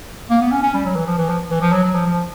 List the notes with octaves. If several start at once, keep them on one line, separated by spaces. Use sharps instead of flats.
A#3
B3
C#4
C#4
G3
F#3
E3
F3
E3
F3
E3
F3
F#3
F#3
F3
F3